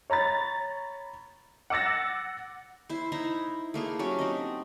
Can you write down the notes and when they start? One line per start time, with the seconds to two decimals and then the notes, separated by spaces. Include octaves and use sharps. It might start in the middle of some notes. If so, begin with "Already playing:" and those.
0.10 C#5 A#5 B5 A6
1.70 F#5 D6 E6 A6 A#6
2.90 E4 C5
3.12 D#4 E4 C5 A#5
3.74 A3 A#3 G#4
3.99 F#3 C#4 G4 A4
4.19 C4 D#4 D#5